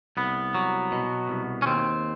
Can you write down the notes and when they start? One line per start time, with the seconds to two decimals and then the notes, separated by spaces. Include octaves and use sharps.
0.17 C2 B3
0.55 F#3
0.92 B2
1.29 C2
1.62 C#4
1.66 D#2 C4